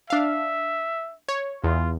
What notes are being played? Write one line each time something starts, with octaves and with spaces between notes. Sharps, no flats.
D4 E5 F5
C#5
E2 F4